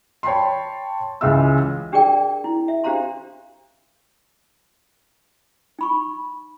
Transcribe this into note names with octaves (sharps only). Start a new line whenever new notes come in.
C#5 G5 A5 B5 C6
C#2 C#3 E3 F4 E5 E6
D4 G4 G#4 A#4 D5 G5
E4
E5
D4 G4 C5 F5 A#5 C6
D#4 B5 C#6